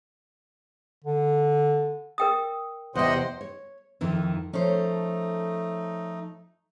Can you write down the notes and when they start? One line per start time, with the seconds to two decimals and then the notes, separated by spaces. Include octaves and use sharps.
1.05 D3
2.18 A#4 G5 D#6
2.95 E2 C3 C5 D#5 F#5 G5
3.41 C#5
4.01 F2 D#3 E3
4.53 F3 A3 C#4 D#4 A4 C5